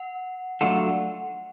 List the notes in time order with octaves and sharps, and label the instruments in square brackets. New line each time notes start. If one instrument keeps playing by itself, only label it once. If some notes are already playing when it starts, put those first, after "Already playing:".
Already playing: [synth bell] F#5
[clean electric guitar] F#3 A3 D4 F4 A4 [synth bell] F#5